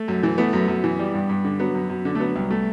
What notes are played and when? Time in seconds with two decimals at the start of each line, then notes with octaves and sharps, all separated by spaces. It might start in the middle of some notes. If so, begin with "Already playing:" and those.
Already playing: A3
0.08 F#2
0.23 E3
0.38 A3 B3
0.53 F#2
0.68 F#2
0.84 E3
0.99 G3
1.14 G2
1.29 G2
1.45 D3
1.60 F#3 B3
1.75 F#2
1.90 F#2
2.05 D3
2.15 A3
2.20 F#3 B3
2.36 C2
2.51 A3